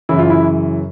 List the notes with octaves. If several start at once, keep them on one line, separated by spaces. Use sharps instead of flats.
F#2 C#3 E3 E4
F4
E4